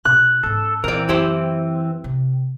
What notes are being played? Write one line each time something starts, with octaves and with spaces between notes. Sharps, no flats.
B2 F#6
G#2 C#4 A4
A#2 D#3 E3 C4 A#4 D5
F#2 E4 G4 C5
C3